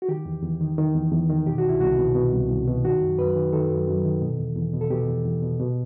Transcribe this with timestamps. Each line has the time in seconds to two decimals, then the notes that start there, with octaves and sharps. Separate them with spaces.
0.02 F#4
0.09 D#3 G4
0.26 E2
0.43 E2
0.60 D#3
0.78 D#3
0.95 E2
1.12 E2
1.29 D#3
1.46 B2 G4
1.58 F#4
1.64 C2
1.69 E4
1.81 C2 F#4
1.98 B2
2.15 B2
2.33 C2
2.50 C2
2.67 B2
2.85 D#3 F#4
3.01 F#2
3.19 F#2 B4
3.36 D#3
3.53 D#3 A4
3.70 F#2
3.87 F#2
4.05 D#3
4.22 B2
4.39 E2
4.56 E2
4.73 B2
4.81 A4
4.91 B2 G4
5.08 E2
5.25 E2
5.42 B2
5.60 B2